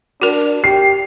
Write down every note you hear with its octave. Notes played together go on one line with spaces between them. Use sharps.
D4 F#4 A#4
G4 C7